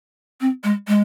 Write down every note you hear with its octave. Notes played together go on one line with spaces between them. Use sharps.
C4
G#3
G#3